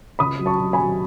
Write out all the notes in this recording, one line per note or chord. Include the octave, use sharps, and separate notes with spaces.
C#2 B5 D#6
F#3
A5 C#6
F#3
G#5 B5
F#3